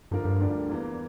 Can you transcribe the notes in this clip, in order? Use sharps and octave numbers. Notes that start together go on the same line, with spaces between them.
G2 D3 F3 A#3 F4 A#4
G2
D2 D3 G3 A#3 D4
E2 E3 A#3